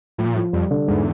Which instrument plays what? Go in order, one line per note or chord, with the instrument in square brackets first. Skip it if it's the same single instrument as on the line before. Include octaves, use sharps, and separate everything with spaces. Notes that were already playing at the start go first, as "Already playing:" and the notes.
[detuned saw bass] A2 [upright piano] F3
[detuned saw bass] A#2
[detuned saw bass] A2 [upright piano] F3
[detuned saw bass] F2 [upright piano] G3
[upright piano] D3
[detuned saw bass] E2 [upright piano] G#2